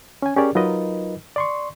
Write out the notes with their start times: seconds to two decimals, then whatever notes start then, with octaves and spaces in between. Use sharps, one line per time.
0.22 C#4 G#5
0.36 C#4 G4 G#4 A#4 C#5 D5
0.55 F#3 D#4 F4 A#4 B4 D#5
1.36 D5 C6 C#6